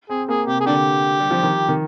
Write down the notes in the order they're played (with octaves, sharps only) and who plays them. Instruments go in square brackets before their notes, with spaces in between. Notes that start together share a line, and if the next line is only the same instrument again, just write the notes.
[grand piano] C4 [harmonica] G#4
[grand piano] A#3 [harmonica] G#4
[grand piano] C3 [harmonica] G4
[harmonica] G#4
[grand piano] D3 [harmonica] D4 G4
[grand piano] G3
F3
D#3
D#3